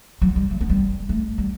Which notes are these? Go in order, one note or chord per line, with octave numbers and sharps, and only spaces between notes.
F#3
G3
A3
B3
G3
A3
G3